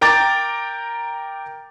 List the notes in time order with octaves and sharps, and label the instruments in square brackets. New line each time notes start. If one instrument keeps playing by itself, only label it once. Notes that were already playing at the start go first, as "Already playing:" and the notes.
[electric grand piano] A#4 G5 A#5 D6 A6